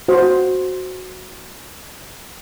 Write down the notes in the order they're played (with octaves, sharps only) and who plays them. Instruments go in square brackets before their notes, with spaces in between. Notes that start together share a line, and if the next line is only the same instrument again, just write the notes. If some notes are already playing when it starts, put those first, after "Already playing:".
[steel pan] F#4 C5